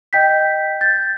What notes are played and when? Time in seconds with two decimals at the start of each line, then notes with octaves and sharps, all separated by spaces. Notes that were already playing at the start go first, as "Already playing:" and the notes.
0.13 D#5 G5 G6 B6
0.81 G6 A6